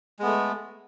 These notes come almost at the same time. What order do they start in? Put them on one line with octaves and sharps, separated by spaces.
G#3 B3 A3